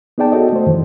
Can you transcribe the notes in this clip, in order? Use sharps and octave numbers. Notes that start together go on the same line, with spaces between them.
B3 D#4 G#4 D5 G5 A5
F#4 A4 C#5 D#5
A3 C5
F#2 D#3 E3